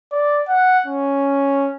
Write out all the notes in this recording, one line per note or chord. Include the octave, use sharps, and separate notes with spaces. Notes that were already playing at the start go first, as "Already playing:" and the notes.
D5
F#5
C#4